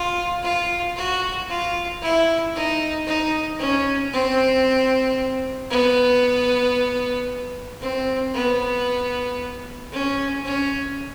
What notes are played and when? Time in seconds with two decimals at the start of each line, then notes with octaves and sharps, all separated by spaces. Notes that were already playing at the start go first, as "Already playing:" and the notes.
Already playing: F4
0.43 F4
0.96 F#4
1.49 F4
2.02 E4
2.55 D#4
3.07 D#4
3.59 C#4
4.13 C4
5.70 B3
7.81 C4
8.34 B3
9.92 C#4
10.45 C#4